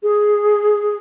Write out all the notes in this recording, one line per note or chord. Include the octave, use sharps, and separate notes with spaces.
G#4